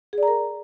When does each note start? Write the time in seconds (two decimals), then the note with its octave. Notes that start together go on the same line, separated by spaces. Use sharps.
0.13 G#4
0.18 D5
0.23 A#5
0.28 A#4